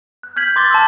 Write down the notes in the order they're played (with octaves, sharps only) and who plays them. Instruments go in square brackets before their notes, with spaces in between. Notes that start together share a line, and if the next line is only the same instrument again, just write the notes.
[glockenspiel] F#6
F6 G6 G#6 B6 F#7
C6 D6 A6 G7
A5 C6 E6